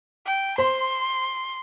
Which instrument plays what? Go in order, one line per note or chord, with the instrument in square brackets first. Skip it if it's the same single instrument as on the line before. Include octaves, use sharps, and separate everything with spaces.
[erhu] G5
[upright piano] C5 [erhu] C6